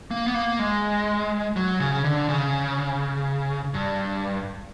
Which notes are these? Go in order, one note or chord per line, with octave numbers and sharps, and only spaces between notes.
A#3
B3
A#3
G#3
F#3
C#3
D3
C#3
G2